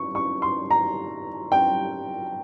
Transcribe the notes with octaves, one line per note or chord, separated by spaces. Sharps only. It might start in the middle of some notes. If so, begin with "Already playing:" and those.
Already playing: C#6
C#6
C6
A#5
G5